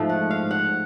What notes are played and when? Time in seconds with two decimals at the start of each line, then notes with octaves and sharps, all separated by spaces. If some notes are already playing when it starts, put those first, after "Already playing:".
Already playing: G#2 F3 A3
0.09 F#5
0.30 F5
0.51 F#5